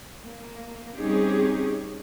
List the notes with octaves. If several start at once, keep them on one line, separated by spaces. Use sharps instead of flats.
A#3
G3 C4 C#4 D#4 G4 G#4